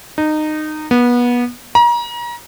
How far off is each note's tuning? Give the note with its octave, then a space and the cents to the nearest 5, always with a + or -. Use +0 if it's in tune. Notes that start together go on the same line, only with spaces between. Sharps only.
D#4 -20
B3 -25
A#5 +35